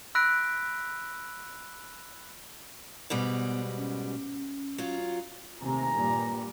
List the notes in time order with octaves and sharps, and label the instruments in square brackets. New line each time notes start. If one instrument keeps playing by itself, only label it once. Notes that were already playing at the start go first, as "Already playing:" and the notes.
[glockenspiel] B5 E6 F#6 A#6 B6 D7
[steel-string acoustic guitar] G#2 B2 G3 [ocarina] B3
[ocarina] C#4
[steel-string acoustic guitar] F#3 F4
[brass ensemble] D#2 G#5 A#5 [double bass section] C3 A3
[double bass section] G2 A#2 G3